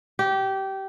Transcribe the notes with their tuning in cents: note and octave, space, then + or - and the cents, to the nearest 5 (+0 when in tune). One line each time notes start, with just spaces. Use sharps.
G4 -20